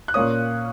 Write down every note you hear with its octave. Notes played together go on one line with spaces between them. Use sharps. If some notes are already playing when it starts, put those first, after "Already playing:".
F#6
A#2 A#3 C#4 D#6